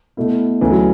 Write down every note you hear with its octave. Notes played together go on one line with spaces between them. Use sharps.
B2 A3 E4
D2 D3 E3 G#3 C#4
F#3